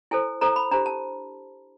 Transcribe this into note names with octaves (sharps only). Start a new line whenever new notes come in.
E4 A4 C5 G#5
E4 A4 C5 A#5
B5
D4 G4 C5 A#5
A5